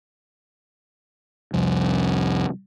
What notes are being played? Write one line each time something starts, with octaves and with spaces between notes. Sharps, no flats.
C2 F2